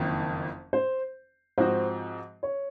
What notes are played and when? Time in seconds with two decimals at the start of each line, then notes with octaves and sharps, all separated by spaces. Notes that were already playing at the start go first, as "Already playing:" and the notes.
Already playing: F#1 F2 D#3 A#3
0.73 C5
1.58 G#2 F3 C4 F#4 C5
2.43 C#5